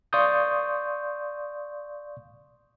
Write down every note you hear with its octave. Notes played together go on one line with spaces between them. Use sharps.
D5 F5 C6 C#6 D#6 G6